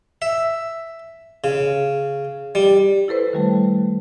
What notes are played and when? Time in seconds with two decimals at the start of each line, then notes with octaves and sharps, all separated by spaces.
0.22 E5
1.44 C#3
2.55 G3
3.08 E4 A4 B4 C5
3.33 D#3 G3 A3